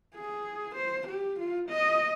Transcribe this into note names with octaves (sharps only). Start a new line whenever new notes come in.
G#4
C5
G4
F4
D#5